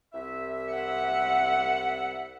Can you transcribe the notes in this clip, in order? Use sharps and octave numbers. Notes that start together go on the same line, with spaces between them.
C2 E5
F#5